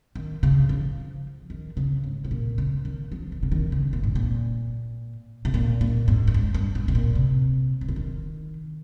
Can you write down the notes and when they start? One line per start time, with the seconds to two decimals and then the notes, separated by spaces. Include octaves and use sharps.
0.16 D#3
0.43 C#3
0.69 F3
1.50 D#3
1.77 C#3
2.04 G#2
2.25 C3
2.31 A#2
2.58 C#3
2.85 D#3
3.12 F3
3.32 D#3
3.43 C#3
3.52 D#3
3.72 C#3
3.93 A#2
4.04 G#2
4.15 A#2
5.45 C3
5.54 A#2
5.81 A#2
6.08 G#2
6.27 G2
6.34 G#2
6.54 G2
6.75 G#2
6.88 C3
6.95 A#2
7.15 C3
7.81 C3
7.89 C#3
7.96 D#3